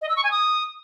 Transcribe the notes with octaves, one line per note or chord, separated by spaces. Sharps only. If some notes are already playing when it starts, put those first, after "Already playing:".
D#5
E6
C#6
G#5
D#6